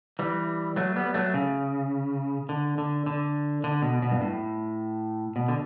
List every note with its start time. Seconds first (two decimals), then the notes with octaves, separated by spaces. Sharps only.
0.19 E3 G3
0.76 F#3 A3
0.96 G3 B3
1.14 F#3 A3
1.34 C#3
2.49 D3
2.78 D3
3.06 D3
3.64 D3
3.82 B2
4.02 B2
4.11 G2
4.21 A2
5.36 B2
5.48 D3